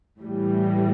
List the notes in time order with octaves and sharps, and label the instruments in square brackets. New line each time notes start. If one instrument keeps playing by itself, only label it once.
[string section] A2 E3 G3